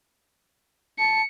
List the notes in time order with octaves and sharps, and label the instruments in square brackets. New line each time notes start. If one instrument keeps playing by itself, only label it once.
[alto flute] A5 [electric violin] C#7